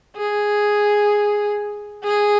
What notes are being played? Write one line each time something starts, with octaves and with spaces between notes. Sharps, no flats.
G#4
G#4